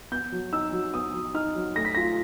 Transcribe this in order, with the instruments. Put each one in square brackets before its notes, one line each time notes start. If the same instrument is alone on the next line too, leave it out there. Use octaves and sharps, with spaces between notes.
[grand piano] B3 G6
F#3
D#4 E6
F#3
B3 D#6
F#3
D#4 F6
F#3
A3 A#6
B6
F4 A#6